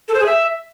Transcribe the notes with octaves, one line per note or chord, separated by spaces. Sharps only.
A4
C5
G#4
E5